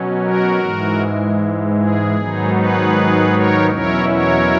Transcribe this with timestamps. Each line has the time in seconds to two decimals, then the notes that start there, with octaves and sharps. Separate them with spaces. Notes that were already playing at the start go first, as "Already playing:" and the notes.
Already playing: B2 F#3 C#4
0.21 F#4 A#4
0.61 G#2 E3 G#3
1.76 G#4
2.16 G#2 D#3 F#3 B3 D#4
2.54 G#4 B4
3.32 A#4 C#5
3.70 E2 B2 F#3 C#4 E4 A#4 C#5
4.09 A#4 C#5